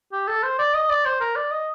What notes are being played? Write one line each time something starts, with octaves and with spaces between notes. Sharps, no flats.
G4
A4
C5
D5
D#5
D5
C5
A#4
D5
D#5